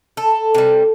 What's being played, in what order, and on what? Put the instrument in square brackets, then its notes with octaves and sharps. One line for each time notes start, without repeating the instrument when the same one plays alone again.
[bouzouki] A4
C3 G3